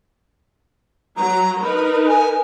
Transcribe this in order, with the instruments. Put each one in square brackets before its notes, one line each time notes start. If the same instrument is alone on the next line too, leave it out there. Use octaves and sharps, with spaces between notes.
[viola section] F#3 [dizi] A#5
[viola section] D#4 A#4 B4 [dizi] B5
[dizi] G#5